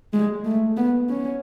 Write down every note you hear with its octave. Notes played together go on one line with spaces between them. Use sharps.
G#3
A3
B3
C#4